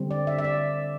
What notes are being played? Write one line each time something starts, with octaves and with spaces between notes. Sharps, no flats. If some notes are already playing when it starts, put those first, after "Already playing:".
Already playing: D3 G3 C4
D5
E5
E5
D5